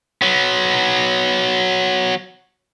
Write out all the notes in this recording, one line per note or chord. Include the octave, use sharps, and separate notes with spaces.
F#3 B3